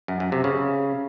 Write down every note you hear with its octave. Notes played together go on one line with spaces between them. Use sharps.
F#2
F#2
C3
C#3